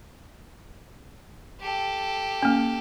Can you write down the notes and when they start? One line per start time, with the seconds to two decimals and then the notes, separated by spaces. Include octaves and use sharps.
1.60 G4 A4
2.42 A#3 C#4